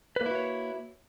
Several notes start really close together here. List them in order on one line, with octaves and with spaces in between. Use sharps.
B4 A#3 E4 F#4 C#5